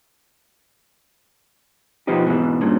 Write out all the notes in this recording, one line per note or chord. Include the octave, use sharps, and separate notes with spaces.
B2 F3 B3 C4 D#4 G4
G#2 B2 E3
G2 A#2 C#3